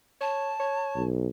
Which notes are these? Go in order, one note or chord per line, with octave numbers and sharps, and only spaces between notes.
C#5 A5
C#5
B1